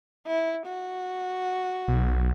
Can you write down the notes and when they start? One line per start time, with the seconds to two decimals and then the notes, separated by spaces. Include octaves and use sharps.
0.27 E4
0.67 F#4
1.88 B1